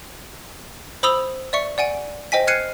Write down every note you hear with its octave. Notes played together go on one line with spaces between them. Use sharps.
C5 B5 D#6 E6 F7 G7
D5 E5 C#6 C#7
D5 F#5 G#5 D7
C5 D#5 G5 G#5 B6
F6 F#6 G#6 C7 C#7 D#7